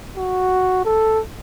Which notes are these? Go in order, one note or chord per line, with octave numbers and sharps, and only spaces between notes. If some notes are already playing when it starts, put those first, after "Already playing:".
F#4
A4